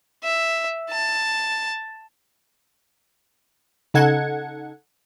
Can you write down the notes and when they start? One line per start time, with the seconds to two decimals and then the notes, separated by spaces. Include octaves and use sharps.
0.23 E5
0.90 A5
3.94 C#3 D#4 A4 F#5 G#6 C#7